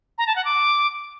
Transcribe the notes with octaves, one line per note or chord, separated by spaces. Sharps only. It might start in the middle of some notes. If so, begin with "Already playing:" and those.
A#5
A5
F#5
D6